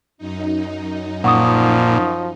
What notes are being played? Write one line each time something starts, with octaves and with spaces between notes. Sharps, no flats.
F#2 D#4
A#2 F3 F#5 C#6 D#6